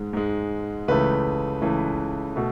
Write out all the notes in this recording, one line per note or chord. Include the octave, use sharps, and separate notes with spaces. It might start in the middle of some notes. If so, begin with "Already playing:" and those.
Already playing: G#2 G#3
G#2 G#3
C#2 C#3 E3 A3 B4
C#2 C#3 E3 A3
B2 A3